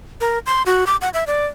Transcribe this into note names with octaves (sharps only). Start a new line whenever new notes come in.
A#4
C6
F#4
D6
F#5
E5
D5